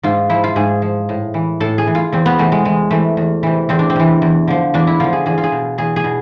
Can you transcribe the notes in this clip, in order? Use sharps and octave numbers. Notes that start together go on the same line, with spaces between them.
G#2 F4
F3 E4
F4
G#2 G#4
F3
A2
E3
A2 A4
G#4
E3
F4
E2 C4
B3
C3 E3 A3
G#3
E2 G#3
C3 E3 A3
E2
C3 E3
E2 C4
D4
C4
C3 E3
E2
D3 F3
E2 D4
E4
D3 F3 F4
G#4
E2 G#4
F4
G#4
B2
E2 G#4
G#4
B2